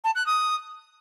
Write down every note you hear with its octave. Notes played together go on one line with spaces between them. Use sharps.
A5
F#6
D#6